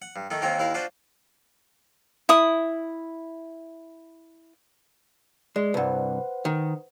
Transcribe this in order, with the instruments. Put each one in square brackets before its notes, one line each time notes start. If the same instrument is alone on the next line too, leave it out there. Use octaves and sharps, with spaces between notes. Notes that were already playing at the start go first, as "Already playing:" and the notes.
[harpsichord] F#5
G2
D#3 A3 D#4
D#2 D#3 A#3 C4 G#5 A#5
D#2 E4 A#4 F5
D4 F4 F#4 C5 G5
[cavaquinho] E4 D#6
[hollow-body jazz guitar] G#3 [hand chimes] D5
[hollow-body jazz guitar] C2 G2 [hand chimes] B4 C5 F#5
[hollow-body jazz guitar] D#3